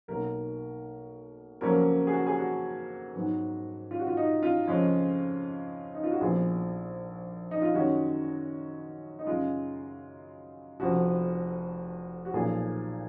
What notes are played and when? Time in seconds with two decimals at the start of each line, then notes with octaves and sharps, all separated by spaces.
0.08 B1 B2 A#3 A#4
1.61 F2 C#3 F#3 A#3 C#4 A#4
2.07 G#4
2.12 F#4
2.27 G#4
2.38 F#4
3.14 G#2 F#3 B3
3.91 F4
3.99 F#4
4.07 F4
4.17 D#4
4.43 F4
4.67 F2 C#3 G#3 C#4
5.95 D#4
6.04 F4
6.12 F#4
6.21 A#1 A#2 F3 B3 G#4
7.51 D#4
7.62 F4
7.74 F#2 D#3 G#3 C#4 F#4
9.19 D#4
9.27 F#2 C#3 G#3 F4
10.80 F1 F2 F3 F#4
12.25 F#4
12.34 B1 A#2 F3 G#4